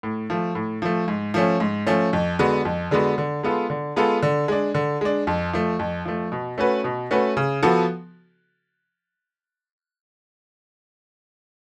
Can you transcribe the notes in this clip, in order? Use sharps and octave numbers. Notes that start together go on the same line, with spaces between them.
A2
F3 A3
A2
F3 A3
G#2
F3 A3 C#4
G#2
F3 A3 C#4
F2
D3 G#3 B3 F#4
F2
D3 G#3 B3 F#4
D3
G#3 B3 F4 A4
D3
G#3 B3 F4 A4
D3
G#3 D4
D3
G#3 D4
F2
F3 A3
F2
F3 A3
B2
A3 C#4 F#4 B4
B2
A3 C#4 F#4 B4
C#3
F3 B3 F#4 A4